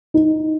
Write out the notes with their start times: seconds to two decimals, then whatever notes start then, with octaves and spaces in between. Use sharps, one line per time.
0.14 D#4